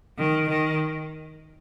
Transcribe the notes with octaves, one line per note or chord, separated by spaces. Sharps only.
D#3
D#3